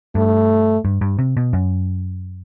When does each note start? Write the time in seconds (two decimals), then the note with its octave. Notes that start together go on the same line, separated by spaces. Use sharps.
0.15 G2 A3
0.85 G2
1.01 G2
1.19 C3
1.37 B2
1.53 F#2